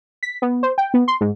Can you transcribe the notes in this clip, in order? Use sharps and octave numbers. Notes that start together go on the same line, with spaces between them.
B6
B3
C5
G5
B3
C6
G#2